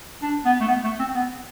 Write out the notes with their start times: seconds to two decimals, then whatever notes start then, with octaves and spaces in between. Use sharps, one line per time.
0.22 D4
0.45 B3
0.61 A3
0.68 B3
0.84 A3
1.00 C4
1.15 B3